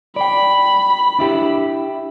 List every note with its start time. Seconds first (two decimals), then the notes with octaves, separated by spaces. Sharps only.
0.16 D5 G5 B5
1.19 D4 E4 G4